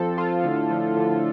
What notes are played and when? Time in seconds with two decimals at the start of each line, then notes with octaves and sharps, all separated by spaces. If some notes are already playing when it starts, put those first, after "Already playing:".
Already playing: F2 F3 C4 A4
0.18 F4
0.44 A2 D3
0.70 F3
0.97 D3